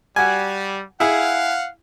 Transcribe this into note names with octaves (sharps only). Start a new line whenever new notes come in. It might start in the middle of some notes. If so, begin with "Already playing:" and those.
G3 F#4 G#5
E4 G#4 F5 F#5